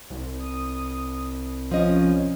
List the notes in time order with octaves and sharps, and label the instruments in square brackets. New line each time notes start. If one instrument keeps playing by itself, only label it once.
[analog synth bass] C2
[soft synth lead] D#6
[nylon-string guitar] F3 D#5 [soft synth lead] C#4